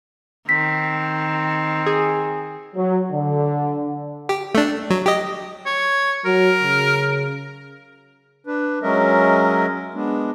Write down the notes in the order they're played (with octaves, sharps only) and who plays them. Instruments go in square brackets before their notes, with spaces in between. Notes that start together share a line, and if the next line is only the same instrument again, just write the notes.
[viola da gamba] D#3 [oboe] C4 [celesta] B6
[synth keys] G#4
[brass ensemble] F#3
D3
[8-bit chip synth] G4
A3 D4
F#3
G4 D#5
[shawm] C#5
[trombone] F#3 [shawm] A#4
[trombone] C#3
[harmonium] D4 B4
F#3 G#3 C#4 A#4 D#5 E5
G#3 B3 D4